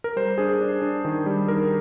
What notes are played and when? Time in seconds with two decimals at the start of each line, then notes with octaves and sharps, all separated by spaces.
0.04 A#4
0.16 G3 C5
0.38 D4 G#4
0.61 D4
0.82 D4
1.05 D#3
1.26 G3
1.48 D#3 A#4